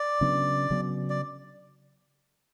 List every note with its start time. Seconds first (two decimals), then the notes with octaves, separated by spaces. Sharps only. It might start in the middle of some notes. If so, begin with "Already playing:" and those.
Already playing: D5
0.21 C#3 F#3 B3 D4
0.71 C#3 F#3 B3 D4
1.10 D5